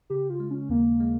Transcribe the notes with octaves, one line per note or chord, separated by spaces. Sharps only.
C#3 G4
F4
G#3
C#4
D#2 A#3
G#3